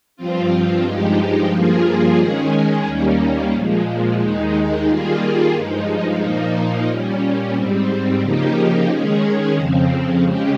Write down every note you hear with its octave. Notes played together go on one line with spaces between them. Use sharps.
G2 F3 C4 F4
G2 F3 G#3 D#4 G4
G2 F3 A#3 F4 G#4
D#3 G#3 C#4 G#4
D#2 D#3 G3 A#3 C#4
A#2 F3 G#3
D#2 D#3 G#3 D#4
D#3 G3 A#3 F4 G#4
G2 F3 G#3 D#4
A#2 F3 A#3 D#4
A#2 G3 C#4
G#2 G3 C4
C#3 F3 A#3 D#4 G4
D#3 G#3 C#4 G#4
F2 C#3 F3 C4
C#3 G#3 C#4 G4